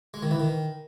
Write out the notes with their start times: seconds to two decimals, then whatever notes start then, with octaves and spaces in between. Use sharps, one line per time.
0.14 G#3
0.23 D#3
0.31 E3
0.40 D#3